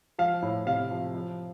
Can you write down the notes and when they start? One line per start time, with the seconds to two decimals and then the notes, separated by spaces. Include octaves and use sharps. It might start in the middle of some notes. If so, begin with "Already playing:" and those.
0.18 F3 F5
0.42 A2
0.66 C3 F5
0.91 F3
1.15 F3